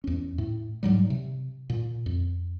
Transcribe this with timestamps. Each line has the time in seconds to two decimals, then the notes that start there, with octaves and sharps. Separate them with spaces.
0.04 E2 C#4
0.38 A2
0.83 G#2 F#3 G3
1.10 C3
1.70 A#2
2.06 F2